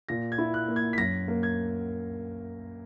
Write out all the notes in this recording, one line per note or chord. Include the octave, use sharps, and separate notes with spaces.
A#2 A#6
G#6
E4
F#6
A#3
G#6
B6
F#2 A#6
A#3
G#6